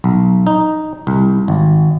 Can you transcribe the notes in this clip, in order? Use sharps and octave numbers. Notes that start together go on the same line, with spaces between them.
B1
D#4
C2
G#1